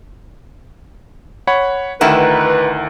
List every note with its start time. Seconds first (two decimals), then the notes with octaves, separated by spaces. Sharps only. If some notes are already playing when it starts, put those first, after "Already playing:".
1.47 C#5 F#5 B5
2.01 D2 D#3 D#4 E4 B4 F#5